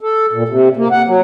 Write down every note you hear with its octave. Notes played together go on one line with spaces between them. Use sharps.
A4
A#2
C3
A#3
F#5
F#3